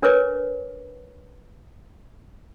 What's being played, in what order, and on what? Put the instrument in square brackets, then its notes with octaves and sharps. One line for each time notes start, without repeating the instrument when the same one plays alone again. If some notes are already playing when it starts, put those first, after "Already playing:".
[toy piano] D4 A#4 B4 C#5 D6